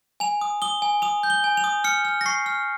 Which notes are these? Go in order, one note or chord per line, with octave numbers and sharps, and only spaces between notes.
G#5 F7
D#6
D#6 G7
G#5
D#6 F7
G6
G7
G#5
F7
D#6
F6 C#7
F6
A#6
C#6 C7
F6